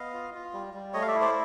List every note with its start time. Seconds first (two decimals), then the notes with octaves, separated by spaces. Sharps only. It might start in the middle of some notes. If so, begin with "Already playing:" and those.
Already playing: B3 D#5 F5
0.13 F4
0.34 F4
0.53 G3
0.74 G3
0.93 A3 C#5 D#5
1.02 F5
1.07 D5 E5
1.14 E4
1.21 C5 D5